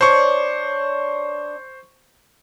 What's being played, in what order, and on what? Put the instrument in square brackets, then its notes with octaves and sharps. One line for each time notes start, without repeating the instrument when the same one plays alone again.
[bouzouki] D4 C#5 [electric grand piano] C5 C#6